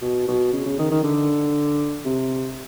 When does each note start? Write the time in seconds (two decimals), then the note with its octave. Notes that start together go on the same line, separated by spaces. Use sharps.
0.02 B2
0.28 B2
0.53 C#3
0.66 C#3
0.79 D#3
0.91 D#3
1.04 D3
2.05 C3